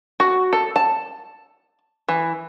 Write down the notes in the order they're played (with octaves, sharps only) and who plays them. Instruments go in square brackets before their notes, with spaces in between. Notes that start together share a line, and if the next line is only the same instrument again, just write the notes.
[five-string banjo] F#4
A4
A5
E3